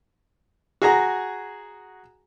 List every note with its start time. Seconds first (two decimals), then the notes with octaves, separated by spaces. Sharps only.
0.82 F#4 G#4 A#5